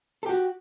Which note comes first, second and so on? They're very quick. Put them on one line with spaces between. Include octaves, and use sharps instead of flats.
A4 G4 F#4